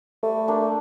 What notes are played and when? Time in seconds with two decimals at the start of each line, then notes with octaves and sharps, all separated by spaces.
0.23 G3 A3
0.48 A#3 D4 G4